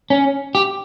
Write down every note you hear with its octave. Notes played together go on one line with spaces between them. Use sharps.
C#4
G4